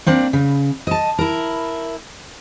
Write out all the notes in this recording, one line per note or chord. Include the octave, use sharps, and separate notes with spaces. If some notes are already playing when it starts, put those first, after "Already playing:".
A#3 C4 D4
C#3
D#5 A5
E4 A#4